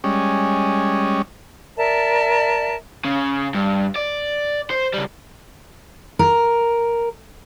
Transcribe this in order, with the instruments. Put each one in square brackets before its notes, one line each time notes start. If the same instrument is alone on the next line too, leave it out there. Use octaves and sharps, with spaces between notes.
[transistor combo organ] G3 G#3 C#4
[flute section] A#4 D5 E5 A5
[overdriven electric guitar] C#3
G2
D5
C5
C#3 G3
[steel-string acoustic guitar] A#4